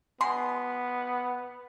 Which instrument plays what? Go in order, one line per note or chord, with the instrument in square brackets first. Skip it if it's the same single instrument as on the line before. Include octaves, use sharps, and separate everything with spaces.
[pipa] B2 G#3 C6 [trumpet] B3